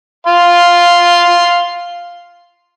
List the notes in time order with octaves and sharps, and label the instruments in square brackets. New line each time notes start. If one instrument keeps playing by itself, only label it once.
[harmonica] F5 C6